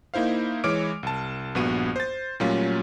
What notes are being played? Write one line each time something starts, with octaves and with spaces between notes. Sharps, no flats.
A#3 D#4 E4 C5 F5
E3 G#3 C#5 D6 F6 D7
C2 A5
A#1 G2 B3 F#4 D#7
C5 A6
A#2 F#3 G3 A3 C#4 F4